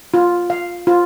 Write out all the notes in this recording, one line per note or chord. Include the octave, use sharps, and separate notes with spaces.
F4
F5
F4